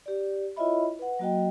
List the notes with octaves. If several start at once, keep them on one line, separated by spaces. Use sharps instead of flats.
G4 D5
E4 F4 C#5 D#5 E5 B5
B4 F#5
F#3 A#3 F#4 D#5 G5